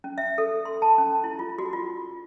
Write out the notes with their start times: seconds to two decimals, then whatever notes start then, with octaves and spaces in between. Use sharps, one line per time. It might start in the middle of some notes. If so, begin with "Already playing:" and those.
0.04 C#4
0.18 E5
0.38 A4
0.65 C6
0.82 A5
0.98 C#4
1.24 E4
1.39 F4
1.58 F#4
1.73 F4